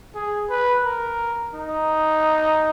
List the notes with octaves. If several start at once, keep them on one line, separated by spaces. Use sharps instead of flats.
G#4
B4
A#4
D#4